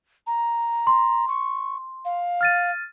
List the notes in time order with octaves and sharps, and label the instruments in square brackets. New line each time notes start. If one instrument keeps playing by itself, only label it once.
[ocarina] A#5
[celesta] C6
[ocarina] C#6
F5
[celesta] F6 A6 D#7